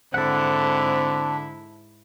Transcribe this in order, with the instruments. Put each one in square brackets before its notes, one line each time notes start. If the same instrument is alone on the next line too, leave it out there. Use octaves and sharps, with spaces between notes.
[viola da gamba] G#2 E4 [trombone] D3 [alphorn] C4 [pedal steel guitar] A4 F#5